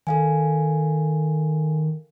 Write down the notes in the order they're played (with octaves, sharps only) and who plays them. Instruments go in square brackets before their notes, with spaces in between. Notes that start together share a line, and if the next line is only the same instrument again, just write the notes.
[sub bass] D#3 [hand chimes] A4 F5 G#5